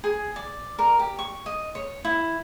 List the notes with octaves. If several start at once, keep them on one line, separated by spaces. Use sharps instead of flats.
G#4
D5
A#4
G4
C#6
D#5
C#5
E4